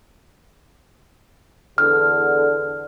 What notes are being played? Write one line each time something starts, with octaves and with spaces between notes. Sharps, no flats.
E2 D3 F6